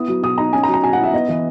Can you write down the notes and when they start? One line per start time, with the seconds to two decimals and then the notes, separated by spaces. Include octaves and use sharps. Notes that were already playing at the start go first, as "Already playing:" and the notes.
Already playing: B3 E4 D#6
0.08 F#3
0.23 B2 D#6
0.38 D#4 A#5
0.53 C#4 G#5
0.63 A#5
0.68 F#3
0.74 A#5
0.83 B2 G#5
0.93 F#5
0.98 E4
1.03 E5
1.13 B3 D#5
1.29 E3